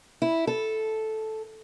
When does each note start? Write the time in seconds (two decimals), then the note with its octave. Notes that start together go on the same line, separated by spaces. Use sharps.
0.22 E4
0.47 A4